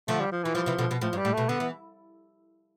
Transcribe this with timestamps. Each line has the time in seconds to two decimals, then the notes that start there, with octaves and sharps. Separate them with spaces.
0.08 D3 F3 A3
0.20 G3
0.32 F3
0.43 E3 F3
0.55 E3 F3 G3
0.66 C3 E3
0.79 B2 D3
0.91 B2
1.01 A2 F3
1.13 G2
1.17 G3
1.25 A2
1.34 B2 A3
1.49 D3 B3
1.60 E3